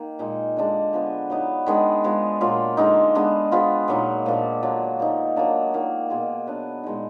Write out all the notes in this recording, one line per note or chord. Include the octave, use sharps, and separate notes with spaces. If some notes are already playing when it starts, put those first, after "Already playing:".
Already playing: D#3 A#3
A#2 G#3 D#4 G#4
D3 G#3 D4
D3 F3 B3
F#3 B3 D#4
D#3 G#3 B3 D4
F3 G#3 B3
A#2 F#3 A#3 F4
D3 G#3 D#4
G#3 B3 D4
F3 B3 F4 G#4
A#2 F#3 A#3 D#4
A#2 F3 A#3 D4
D3 F#3 D4 F4
F3 A#3 D#4
F#3 A#3 D4
D#3 A#3 F4
B2 A#3 F4 G#4
F#3 B3 D4
A#2 G#3 D#4